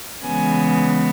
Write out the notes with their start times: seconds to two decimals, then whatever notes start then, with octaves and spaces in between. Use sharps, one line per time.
0.25 C#3 E3 G#3 B3 G#5